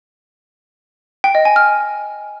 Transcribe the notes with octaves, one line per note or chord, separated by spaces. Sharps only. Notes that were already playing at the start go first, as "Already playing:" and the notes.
G5
D#5
G#5
F6